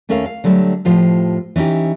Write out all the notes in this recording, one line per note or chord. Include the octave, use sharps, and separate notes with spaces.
D#2 A3 C#4 A4 A#4 F5
F5
D3 F#3 G3 A3
A2 F3 F4 G4
E3 C#4 D#4 G4